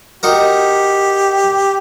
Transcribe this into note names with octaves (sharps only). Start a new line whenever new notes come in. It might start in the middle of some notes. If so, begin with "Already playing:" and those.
D#4 F#4 G4 A#4